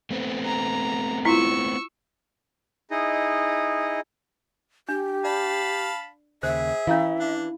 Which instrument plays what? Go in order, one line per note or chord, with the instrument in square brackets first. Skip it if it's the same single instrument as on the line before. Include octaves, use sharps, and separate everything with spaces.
[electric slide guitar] A3 B3 C4
[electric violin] A#5
[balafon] E4 F4 [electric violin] C#6 E6
[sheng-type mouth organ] D#4 E4 G#4 D#5
[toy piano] D4 [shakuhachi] G4
[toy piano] D5 [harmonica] F5 A5 B5
[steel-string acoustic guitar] D#2 C#3 [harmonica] G#4 [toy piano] C5 [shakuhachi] E5
[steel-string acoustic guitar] E3 [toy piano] C#4 E4 F5
[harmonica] D4